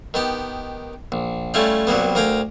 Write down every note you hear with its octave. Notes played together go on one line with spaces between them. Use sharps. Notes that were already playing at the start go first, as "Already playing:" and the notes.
D#3 B3 G4
A#1
G3 A3 C#4 E4 F4 G4
C2 F#3 G3 A#3 B3
D2 A#4 F5 G5 G#5 A#5